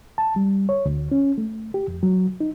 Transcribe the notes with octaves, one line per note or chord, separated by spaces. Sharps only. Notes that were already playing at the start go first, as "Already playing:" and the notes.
A5
G3
C#5
D2
C#4
A3
G4
F2
F#3
D#4